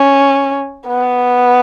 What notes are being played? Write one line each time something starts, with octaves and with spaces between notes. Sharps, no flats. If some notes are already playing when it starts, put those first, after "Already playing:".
Already playing: C#4
B3